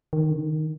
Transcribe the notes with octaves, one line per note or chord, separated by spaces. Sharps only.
D#3
D3
D#3